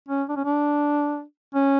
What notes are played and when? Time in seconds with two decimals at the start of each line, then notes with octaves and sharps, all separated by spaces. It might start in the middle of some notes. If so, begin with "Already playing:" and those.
0.08 C#4
0.29 D4
0.36 C#4
0.45 D4
1.54 C#4